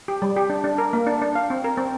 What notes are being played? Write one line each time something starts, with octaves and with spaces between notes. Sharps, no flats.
G4
G3
G4
D4
D4
A#4
A#3
D4
D4
F5
C4
A#4
C4